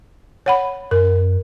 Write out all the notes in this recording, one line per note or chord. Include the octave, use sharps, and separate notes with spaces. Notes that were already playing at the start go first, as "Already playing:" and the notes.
C#5 F#5 B5
F#2 A#4